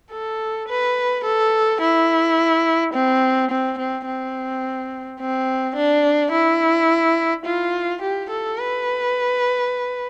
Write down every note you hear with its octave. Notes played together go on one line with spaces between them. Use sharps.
A4
B4
A4
E4
C4
C4
C4
C4
C4
D4
E4
F4
G4
A4
B4